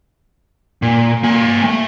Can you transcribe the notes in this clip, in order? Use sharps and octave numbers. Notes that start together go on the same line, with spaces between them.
A#2
A#3 G#5
A3